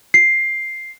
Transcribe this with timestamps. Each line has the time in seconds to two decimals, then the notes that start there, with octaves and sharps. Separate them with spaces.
0.14 C7